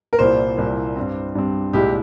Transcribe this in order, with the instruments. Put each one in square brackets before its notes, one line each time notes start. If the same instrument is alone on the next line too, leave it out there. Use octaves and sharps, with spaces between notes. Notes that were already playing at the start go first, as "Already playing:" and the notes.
[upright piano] A#4
[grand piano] C2 A#2 G3 A#3 E4 [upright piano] C5
[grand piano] C2 A#2 G3 A#3 E4
G2 G3 C4
G2 G3 C4
[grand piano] C2 A#2 G#3 E4 [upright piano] G4